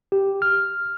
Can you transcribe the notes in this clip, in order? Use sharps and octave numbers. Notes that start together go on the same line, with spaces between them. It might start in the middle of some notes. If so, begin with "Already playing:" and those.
G4
F6